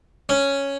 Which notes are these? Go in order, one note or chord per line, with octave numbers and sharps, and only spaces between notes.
C#4